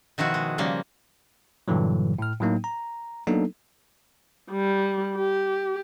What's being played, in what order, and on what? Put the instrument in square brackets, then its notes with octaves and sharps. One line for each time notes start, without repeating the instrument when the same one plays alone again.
[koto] B2 D#3 F3 E4 F#4
G#3
C#3 F3 G3 A#3
[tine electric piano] G2 A#2 D3 E3 F#3
A2 F6
A2 F#3 A#3 D#4
A#5
F#3 A#3 B3 D4 D#4 A4
[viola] G3
G4